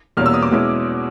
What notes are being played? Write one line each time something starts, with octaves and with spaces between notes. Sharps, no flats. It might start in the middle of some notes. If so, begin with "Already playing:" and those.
E2 B2 G3 A#3 C#4 F6
E6
D#6
D6
B2 G#3 C#4 E4